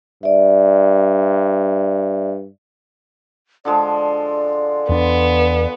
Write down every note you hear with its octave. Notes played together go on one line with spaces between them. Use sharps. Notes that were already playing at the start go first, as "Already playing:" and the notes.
G2 D5 E5
D3 F3 G#3 D5
E2 B3 D4